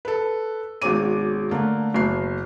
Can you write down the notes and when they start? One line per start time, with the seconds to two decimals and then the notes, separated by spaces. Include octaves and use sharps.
0.05 A4 B4
0.82 G#1 B2 G#3 C#4 D6 D#7
1.51 D3 A3 A#3
1.94 F#1 B2 C7